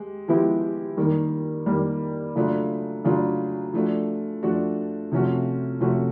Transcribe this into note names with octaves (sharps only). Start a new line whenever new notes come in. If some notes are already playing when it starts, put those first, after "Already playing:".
Already playing: G#3 G4
F3 G#3 B3 E4 G4
D#3 G3 A#3
D#3 G3 A#3
C#3 F#3 A3 D4 F4
C#3 F#3 A3 D4 F4
F3 A3 D4 F#4
F3 A3 D4 F#4
C3 F3 A3 C#4 F#4
C3 F3 A3 C#4 F#4